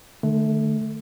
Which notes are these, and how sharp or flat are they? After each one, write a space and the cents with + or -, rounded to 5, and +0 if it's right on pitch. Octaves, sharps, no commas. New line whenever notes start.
D3 +45 A3 -10